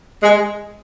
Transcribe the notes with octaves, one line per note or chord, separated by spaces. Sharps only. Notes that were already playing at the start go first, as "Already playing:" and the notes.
G#3